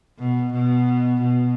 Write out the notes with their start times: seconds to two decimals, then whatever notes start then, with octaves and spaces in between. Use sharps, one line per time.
0.19 B2
0.53 B2
1.22 B2